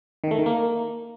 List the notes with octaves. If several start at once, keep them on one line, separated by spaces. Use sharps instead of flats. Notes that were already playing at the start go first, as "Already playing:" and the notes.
D#3
A3
D#3
A#3